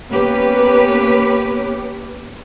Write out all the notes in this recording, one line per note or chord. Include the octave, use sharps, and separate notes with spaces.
A#3 B3 C#4 G4 B4